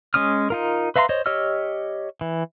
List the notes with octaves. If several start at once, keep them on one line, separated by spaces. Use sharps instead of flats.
G#3 C#4 D#6 F6
D#4 F4 A#4
B4 E5 F5 A#5 C6
C5 C#5 D#5
G4 C#5 D#5 E6 F6
E3